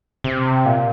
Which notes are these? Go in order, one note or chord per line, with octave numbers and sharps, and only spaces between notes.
C3
A#2